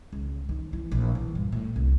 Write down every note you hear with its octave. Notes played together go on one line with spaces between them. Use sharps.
C#2
D#3
E3
A#1
E3
G2
A2
C2